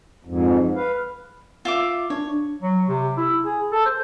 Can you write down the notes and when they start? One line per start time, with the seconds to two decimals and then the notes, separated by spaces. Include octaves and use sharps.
0.25 F2 G#2
0.75 B4 F5
1.65 F4 E5 D6
2.10 D4 C#5
2.62 F#3
2.89 C3
3.17 E4
3.44 G#4
3.72 A4
3.86 C5